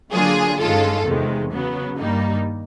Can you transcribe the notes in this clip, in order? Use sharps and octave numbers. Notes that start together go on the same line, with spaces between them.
D3 F#3 A#3 D4 F4 G#4
G2 D#3 G#3 C#4 F4 A4
E2 C3 D#3 G#3
C#3 F#3 B3
G2 D#3 G3 A#3 D#4